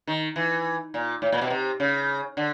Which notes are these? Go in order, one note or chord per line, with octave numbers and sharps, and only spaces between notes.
D#3
E3
A#2
A2
A#2
B2
C3
C#3
D3